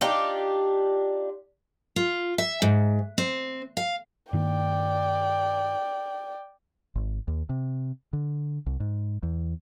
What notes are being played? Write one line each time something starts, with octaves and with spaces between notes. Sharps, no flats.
D4 D#4 F4 G4
F4
E5
G#2
C4
F5
G2 D#3 A#3 D5 G5
G#1
D#2
C3
D3
C2
G#2
E2